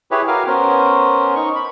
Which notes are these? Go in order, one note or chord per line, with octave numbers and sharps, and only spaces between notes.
E4 G4 G#4 B4 C#5
F#4 A#4 F5 G#5 D6 F6
B3 C#4 A#4 C5
D#4 C#6
B5